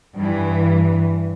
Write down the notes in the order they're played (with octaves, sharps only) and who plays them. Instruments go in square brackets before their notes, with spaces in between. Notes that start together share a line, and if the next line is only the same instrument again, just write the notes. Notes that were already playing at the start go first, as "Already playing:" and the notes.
[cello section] G2 E3